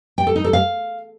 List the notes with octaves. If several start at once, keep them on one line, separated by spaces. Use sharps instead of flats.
G5
A4
D#4
A4
F5